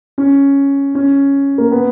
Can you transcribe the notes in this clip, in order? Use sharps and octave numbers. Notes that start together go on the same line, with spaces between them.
C#4
C#4
A#3
B3